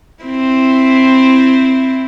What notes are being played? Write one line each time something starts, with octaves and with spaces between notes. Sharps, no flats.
C4 E4